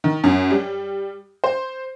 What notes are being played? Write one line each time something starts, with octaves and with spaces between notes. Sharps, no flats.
D#3
F#2
G3
C5